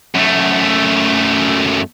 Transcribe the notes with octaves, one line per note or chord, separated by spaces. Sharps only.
F#2 A3